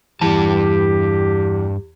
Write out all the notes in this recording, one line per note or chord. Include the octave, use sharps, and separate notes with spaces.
E2 G2 G4 A5